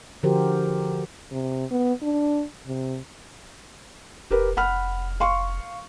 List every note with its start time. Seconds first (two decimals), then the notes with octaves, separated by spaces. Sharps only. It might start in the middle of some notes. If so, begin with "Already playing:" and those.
0.23 D3 F3 F#4 G4 A#4 C5
1.31 C3
1.71 B3
2.02 D4
2.67 C3
4.31 E1 G4 A#4 B4
4.57 F1 F#5 B5 F6
5.20 F5 C6 C#6